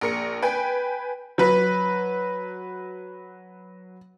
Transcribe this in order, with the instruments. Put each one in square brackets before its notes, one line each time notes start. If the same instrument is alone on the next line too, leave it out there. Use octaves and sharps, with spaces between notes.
[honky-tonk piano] A#1 A#4 C#7
B4 G5 G#5
F#3 B4